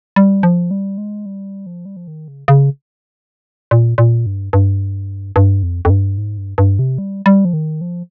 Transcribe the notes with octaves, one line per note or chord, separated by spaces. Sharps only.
G3
F3
G3
G#3
G3
F3
G3
F3
D#3
C#3
C#3
A#2
A#2
G2
G2
G2
F2
F2
G2
G#2
G2
G2
C3
G3
G3
F3
D#3
F3